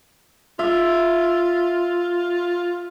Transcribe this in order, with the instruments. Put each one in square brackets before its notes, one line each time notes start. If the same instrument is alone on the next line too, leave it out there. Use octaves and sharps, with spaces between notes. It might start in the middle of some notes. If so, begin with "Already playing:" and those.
[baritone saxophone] F4 [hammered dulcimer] E5